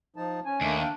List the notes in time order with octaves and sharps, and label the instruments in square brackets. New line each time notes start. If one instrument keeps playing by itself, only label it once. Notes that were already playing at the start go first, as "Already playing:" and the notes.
[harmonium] F3 D#4 A5
[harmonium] C#4 [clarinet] G#5
[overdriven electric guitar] D#2 [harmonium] A3 A#3 D4
[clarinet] D4 [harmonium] F5 G5